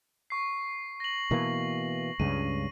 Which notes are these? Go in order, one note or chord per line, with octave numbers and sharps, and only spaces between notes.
C#6 C7
A#6 F#7
B2 E3 A#3
C#2 G2 C#3 D#7